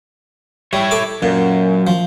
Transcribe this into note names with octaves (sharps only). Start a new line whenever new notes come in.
G3 E4 C#5
A4 C#6 D6
F#2 A#2
F3